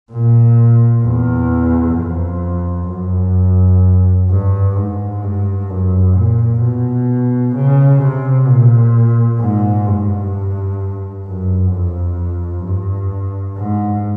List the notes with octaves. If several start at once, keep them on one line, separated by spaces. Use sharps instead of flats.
A#2
E2
F2
F#2
G2
G#2
G2
F#2
A#2
B2
C#3
C3
A#2
G#2
G2
F#2
F2
G2
G#2